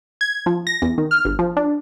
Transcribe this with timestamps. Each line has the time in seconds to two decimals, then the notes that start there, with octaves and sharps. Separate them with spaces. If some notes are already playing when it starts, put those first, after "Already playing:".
0.21 G#6
0.46 F3
0.67 A#6
0.82 E2
0.98 D#3
1.11 F6
1.25 G1
1.39 F3
1.57 D4